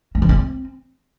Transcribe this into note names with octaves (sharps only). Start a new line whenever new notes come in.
A3
F3
C4